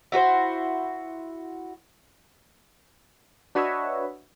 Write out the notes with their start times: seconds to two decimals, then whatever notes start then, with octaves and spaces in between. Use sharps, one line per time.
0.12 E4 F#4 B4 C5
3.55 D4 F#4 B4 C#5 D#5 E5